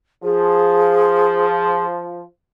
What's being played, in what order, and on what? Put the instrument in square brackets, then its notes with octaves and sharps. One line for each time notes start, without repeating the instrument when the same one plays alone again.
[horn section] F3 [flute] G#4